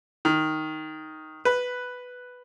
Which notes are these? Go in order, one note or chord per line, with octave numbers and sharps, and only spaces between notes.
D#3
B4